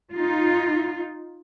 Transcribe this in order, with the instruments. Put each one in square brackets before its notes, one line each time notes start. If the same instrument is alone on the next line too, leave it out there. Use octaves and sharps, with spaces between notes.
[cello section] D#4 F4